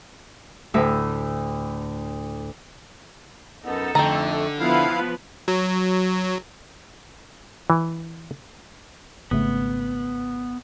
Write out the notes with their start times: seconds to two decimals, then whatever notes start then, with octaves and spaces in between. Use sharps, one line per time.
0.74 D2 A2 E5
3.65 F#2 B3 D#4 A4
3.95 F2 D3 A3 G5 A#5
4.60 F3 B3 E4 B4 F5
5.48 F#3
7.70 E3
9.31 G#1 C#3 A3 B3